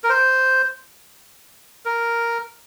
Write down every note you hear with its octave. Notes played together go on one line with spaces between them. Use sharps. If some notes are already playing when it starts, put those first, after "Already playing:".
A#4
C5
A#4